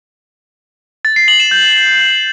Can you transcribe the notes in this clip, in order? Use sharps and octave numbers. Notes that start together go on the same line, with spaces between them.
A6
C7
F#7
E7
G6